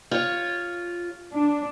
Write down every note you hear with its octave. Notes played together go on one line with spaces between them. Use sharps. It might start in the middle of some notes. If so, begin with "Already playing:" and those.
F4 C#5
D4